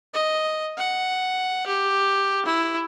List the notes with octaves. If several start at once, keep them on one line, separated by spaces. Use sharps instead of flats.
D#5
F#5
G4
E4